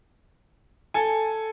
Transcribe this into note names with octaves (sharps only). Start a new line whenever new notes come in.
A4 G#5